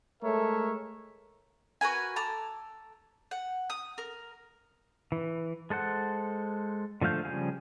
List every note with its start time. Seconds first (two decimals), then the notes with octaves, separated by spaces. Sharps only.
0.23 G#3 A3 A4 A#4 C#5 E5
1.81 F#4 A#4 B4 G#5
2.16 A4 A#5 D6
3.31 F#5
3.70 D#6
3.98 A#4
5.12 E3
5.70 G#3 A4 C5 F#5
7.02 D3 F3 A3 F5 G6
7.25 C#3 F3 G3 G#4